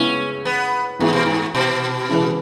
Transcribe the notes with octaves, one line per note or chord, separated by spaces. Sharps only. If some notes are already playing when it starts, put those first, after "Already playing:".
Already playing: C#3 G#3 B3 C#4 E4
B3
G#2 E3 B3 E4 G#4
B2
G#2
B2
C#3 E3 G#3 E4 B4